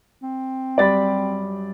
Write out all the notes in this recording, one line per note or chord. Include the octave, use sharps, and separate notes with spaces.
C4
F#2 G3 D5 B5 A6